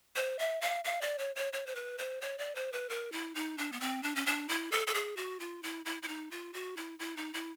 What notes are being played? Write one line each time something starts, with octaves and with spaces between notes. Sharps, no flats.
C5
E5
F5
F5
D5
C#5
C#5
C#5
C5
B4
C5
C#5
D5
C5
B4
A#4
E4
D#4
D4
B3
C4
D4
C#4
D4
E4
A4
A4
G#4
F#4
F4
E4
E4
E4
D#4
F4
F#4
E4
E4
D#4
E4